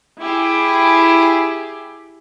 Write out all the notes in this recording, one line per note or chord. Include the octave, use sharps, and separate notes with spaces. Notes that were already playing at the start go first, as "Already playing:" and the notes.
E4 G4 G#4